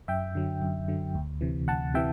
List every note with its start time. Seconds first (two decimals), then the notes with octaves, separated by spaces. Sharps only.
0.08 F#2 E5 G5
0.35 D3 F#3
0.62 F#2
0.88 D3 F#3
1.15 D2
1.41 C3 E3
1.68 D2 F#5 A5
1.94 C3 E3 E5 G5